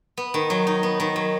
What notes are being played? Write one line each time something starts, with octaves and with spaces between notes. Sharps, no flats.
B3
D#3
F#3
D#4
B3
D#3
F#3